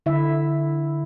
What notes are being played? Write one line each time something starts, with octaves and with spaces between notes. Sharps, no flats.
D3 E4 E5